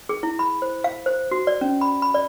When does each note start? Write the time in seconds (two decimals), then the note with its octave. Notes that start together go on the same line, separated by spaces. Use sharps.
0.09 G#4
0.23 E4
0.39 B5
0.62 C5
0.84 F5
1.06 C5
1.31 F#4
1.47 D5
1.61 C#4
1.81 B5
2.02 B5
2.14 D5